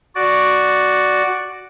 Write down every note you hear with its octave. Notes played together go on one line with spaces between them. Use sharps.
F#4 D5